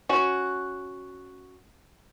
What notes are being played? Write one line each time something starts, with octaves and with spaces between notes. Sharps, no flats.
C#4 F#4